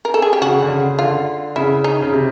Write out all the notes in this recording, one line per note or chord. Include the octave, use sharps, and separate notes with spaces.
A#4
A4
G#4
G4
C#3 F#4
D3
C#3
D3 F4
C#3 E4
D#4
C#3
C3